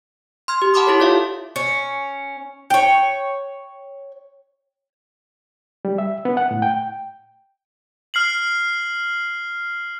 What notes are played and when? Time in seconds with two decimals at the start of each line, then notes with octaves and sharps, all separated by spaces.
0.48 C6 F6 G#6
0.62 G4
0.74 F#5 A5 B5 C6 D6 D#6
0.87 E4 G4 A4 C#5
1.00 F4 A4 C#5 D5 E5 F5
1.56 C#4
2.70 C#5 G5
5.85 G3
5.98 E5
6.25 B3
6.37 F#5
6.51 A2
6.62 G5
8.14 F6 C7 F#7